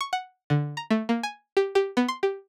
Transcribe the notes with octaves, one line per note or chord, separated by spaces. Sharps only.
C#6
F#5
D3
A#5
A3
A#3
G#5
G4
G4
B3
C6
G4